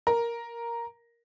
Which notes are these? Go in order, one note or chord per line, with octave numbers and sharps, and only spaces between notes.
A#4